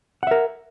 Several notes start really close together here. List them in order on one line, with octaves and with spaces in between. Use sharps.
F#5 E5 A#4